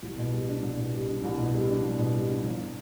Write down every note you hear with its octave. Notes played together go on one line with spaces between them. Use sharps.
C2
B2
G3
D4
C2
B2
G3
D4
C2
B2
G3
D4
C2
B2
G3
D4
G1